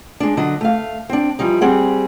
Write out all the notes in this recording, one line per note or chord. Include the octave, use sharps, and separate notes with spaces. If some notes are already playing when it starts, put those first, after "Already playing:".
G#3 D4
D3 F#3 D4 D#5
A3 F5
C4 D4
E3 F3 G3 D#4
G3 C4 G#4 F#5